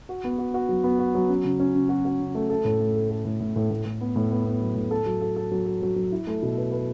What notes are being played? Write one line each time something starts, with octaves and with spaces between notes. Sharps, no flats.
F#4
B3
F#4
F#4
F#3
B3
F#4
F#3
C#4
C#3
C#4
C#3
F#4
F#4
C#3
A3
A4
A2
A3
A4
A4
A2
A2
A2
A2
A2
B3
A2
B3
B3
F#3
A2
A4
F#3
A4
A4
F#3
A4
F#3
F#3
E4
A3
B2
B4
B4